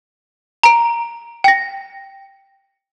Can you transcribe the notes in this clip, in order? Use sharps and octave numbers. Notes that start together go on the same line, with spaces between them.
A#5 D7
G5 A#6